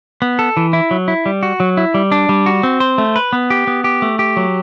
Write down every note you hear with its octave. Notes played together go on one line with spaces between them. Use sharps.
B3
A4
E3
E4
F#3
E4
G3
F#4
F#3
E4
G3
D4
G3
F#4
C4
C5
A3
B4
B3
G4
B3
G4
A3
G4
F#3